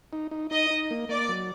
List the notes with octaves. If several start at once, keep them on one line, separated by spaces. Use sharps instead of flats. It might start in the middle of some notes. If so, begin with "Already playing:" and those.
D#4
D#4
D#4 D#5
D#4
A#3
A#3 D5
F#3